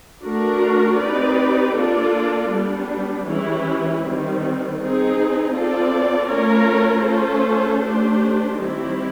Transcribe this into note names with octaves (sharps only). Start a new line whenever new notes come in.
A3 D4 F#4 A#4
C4 D#4 G4 B4 D5
A#3 D4 F4 A4 D5
G3 B3 D4
E3 G#3 C#4 E4 G4
D#3 G3 C4
C4 D#4 G#4
C4 F4 A4 D5
A3 C#4 F4 A#4 C#5
A3 C#4 F4 A4 C5
A3 D4 G4 C5
D#3 G3 C4 E4 G4